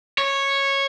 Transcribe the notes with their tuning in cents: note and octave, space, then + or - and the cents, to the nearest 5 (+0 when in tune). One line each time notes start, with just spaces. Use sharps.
C#5 -10